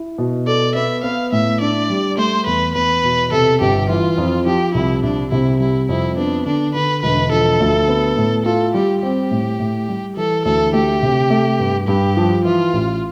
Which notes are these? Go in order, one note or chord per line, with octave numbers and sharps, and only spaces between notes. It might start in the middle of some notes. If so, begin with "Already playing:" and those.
Already playing: E4
B2
A4 D5
B3 E5
B3 F5
A2 E5
D4 D5
G3
A3 C5
E2 B4
E2 B4
B2
C3 A4
G1 G4
E3 F4
F2
F3 G4
C2 E4
C2 D4
C3 E4
G3 E4
F2 E4
B3 D4
D3 D4
D3 B4
E1 B4
F3 A4
D2
B3
A2
F4 A4
G3 G4
C4 G4
A2
A2
G3
E3 A4
D2 A4
A3 G4
C3
A3
G2
G2 G4
F3
E3 F4
A1